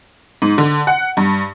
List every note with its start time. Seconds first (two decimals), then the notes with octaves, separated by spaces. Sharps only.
0.42 G#2
0.58 D3
0.87 F#5
1.17 G2